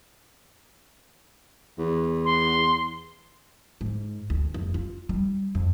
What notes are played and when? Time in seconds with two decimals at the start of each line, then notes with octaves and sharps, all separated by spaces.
1.78 E2
2.25 C6
3.81 G#2
4.30 D2
4.54 F1
4.74 F4
5.09 G3
5.55 F2